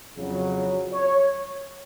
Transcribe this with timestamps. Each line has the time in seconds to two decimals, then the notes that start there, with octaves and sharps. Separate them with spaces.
0.17 F2 C#3 F#3
0.93 C#5